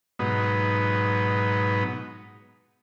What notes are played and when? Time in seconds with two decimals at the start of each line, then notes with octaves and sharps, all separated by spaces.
0.19 G#2 B2 F#3 B3 D#4